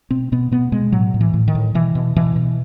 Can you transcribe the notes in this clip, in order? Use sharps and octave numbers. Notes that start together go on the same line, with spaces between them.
B2 C4
B2 B3
B2 B3
B2 G#3
A2 F#3
A2
E3
A2
D#3
A2
B2 E3
B2
B2 E3
B2